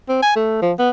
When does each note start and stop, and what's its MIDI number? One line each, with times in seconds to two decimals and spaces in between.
0.09 0.18 60
0.22 0.34 80
0.36 0.57 57
0.62 0.73 53
0.79 0.90 59